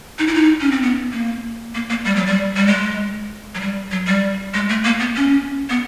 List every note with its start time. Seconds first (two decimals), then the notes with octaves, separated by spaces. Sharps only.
0.19 D#4
0.27 E4
0.34 D#4
0.61 C#4
0.71 C4
0.82 B3
1.13 A#3
1.75 A#3
1.90 A#3
2.05 G3
2.16 F#3
2.26 G3
2.57 G3
2.67 G#3
3.55 F#3
3.60 G3
3.91 F#3
4.07 G3
4.54 G#3
4.69 A3
4.84 A#3
5.00 B3
5.16 C#4
5.70 B3